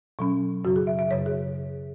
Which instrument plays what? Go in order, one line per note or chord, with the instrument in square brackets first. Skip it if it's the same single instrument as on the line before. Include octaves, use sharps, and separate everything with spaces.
[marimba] B2 F#3 C#4
F#2 C#3 F#3 F#4
G#4
E5
E5
F#2 C#3 F#3 C#5
G#4